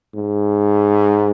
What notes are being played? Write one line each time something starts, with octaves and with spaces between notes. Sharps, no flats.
G#2